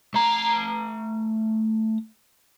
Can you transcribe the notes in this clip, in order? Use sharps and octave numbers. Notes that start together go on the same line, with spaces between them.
A3 A#5